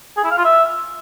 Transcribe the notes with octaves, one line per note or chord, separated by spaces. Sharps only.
G#4
E4
F5
F4
E5